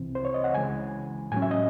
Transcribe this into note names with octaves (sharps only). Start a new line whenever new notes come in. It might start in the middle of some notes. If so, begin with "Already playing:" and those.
Already playing: C2 C3 E3 C4
C5
C#5
D#5
F#5
C#2 C#3 E3 G#3 G#5
A2 F#3 C#4 G#5
E5
D#5